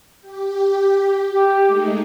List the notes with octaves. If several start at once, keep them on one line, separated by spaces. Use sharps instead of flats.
G4
G4
G#3 A3 D#4